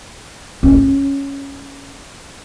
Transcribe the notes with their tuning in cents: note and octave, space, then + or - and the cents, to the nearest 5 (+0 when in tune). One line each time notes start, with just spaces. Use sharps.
C#4 +0